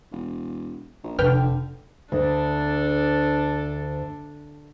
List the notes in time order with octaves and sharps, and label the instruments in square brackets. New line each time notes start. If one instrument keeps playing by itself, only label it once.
[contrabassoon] E1
A#1
[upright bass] F1 [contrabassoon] D3 [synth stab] B4 G5 F6
[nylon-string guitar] D2 [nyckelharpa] D4 A4